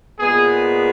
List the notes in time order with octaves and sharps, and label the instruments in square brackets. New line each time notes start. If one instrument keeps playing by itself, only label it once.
[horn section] A#2 G#3 B3 G#4